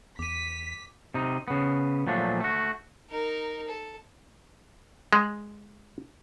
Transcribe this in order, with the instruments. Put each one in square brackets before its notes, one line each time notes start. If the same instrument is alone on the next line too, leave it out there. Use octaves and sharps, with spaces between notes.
[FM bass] E2 [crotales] D6 D#7 [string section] B6
[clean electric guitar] C3 D#4
C#3 B3
A#2 F3 F#3 A3 D4
A3 F#4
[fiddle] D#4 A#4
A4
[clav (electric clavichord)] G#3